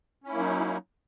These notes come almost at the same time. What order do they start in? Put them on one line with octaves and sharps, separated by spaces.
C#4 E4 A#3 F#3 D#4